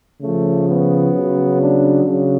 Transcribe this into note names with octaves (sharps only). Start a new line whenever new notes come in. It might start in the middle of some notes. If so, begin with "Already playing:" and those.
C#3 F3 A3
B3
C#3 F#3
D4
C#3 F#3